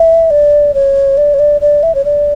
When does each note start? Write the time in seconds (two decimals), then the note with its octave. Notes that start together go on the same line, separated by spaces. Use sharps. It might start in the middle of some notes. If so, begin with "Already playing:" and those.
Already playing: E5
0.31 D5
0.74 C#5
1.17 D5
1.34 C#5
1.39 D5
1.61 D5
1.83 E5
1.95 C#5
2.05 D5